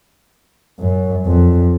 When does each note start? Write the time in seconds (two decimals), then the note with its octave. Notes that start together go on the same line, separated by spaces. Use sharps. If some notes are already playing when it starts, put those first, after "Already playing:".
0.80 F#2
1.26 F2